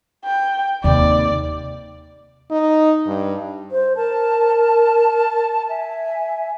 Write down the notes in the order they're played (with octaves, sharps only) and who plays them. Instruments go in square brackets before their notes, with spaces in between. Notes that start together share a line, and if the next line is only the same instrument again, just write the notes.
[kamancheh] G5
[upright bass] D#2 C3 [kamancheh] D5
[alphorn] D#4
G2
[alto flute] C5
[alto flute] A#4 [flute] A5
[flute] E5 [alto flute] G#5